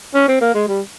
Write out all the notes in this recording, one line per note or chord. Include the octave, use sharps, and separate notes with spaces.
C#4
C4
A#3
G#3
G3